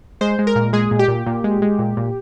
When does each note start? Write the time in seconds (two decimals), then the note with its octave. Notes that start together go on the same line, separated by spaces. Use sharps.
0.21 G#3 C5
0.39 G#3
0.47 A#4
0.56 A#2
0.73 G#3 G#4
0.91 A#2
0.99 G4
1.08 A#2
1.26 A#2
1.44 G#3
1.62 G#3
1.79 A#2
1.97 A#2